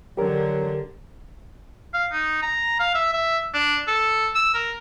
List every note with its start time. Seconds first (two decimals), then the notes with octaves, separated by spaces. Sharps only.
0.17 D3 F#3 G4 A#4
1.94 F5
2.12 D#4
2.42 A#5
2.79 F5
2.95 E5
3.13 E5
3.54 D4
3.87 A4
4.35 E6
4.54 A#4